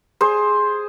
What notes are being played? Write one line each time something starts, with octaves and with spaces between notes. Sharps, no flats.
G#4 C5